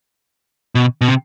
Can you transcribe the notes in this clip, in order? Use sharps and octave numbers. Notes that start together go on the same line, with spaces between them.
B2
B2
C3